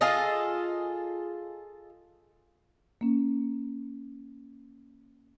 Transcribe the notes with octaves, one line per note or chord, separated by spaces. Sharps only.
F4 G#4 A4 D#5
A#3 C#4